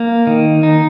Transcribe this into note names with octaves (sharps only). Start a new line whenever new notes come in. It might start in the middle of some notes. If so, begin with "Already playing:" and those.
Already playing: A#3
D#3
D#4